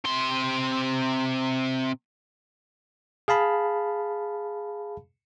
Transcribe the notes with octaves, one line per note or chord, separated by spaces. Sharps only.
C3 C6
G#4 F5 A5 B5